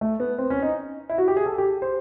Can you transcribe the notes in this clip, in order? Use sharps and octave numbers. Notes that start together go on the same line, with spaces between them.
A3
B3
C4
C#4
D#4
E4
F#4
G4
G#4
A4
G4
C5